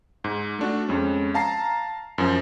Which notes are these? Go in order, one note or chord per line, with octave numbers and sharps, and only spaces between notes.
G#2
A3 D4 F#4
F2 G#3 C#4
F5 A5 A#5 C7
F#2 F3